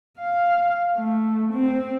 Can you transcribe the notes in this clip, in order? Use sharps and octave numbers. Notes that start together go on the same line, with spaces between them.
F5
A3
C4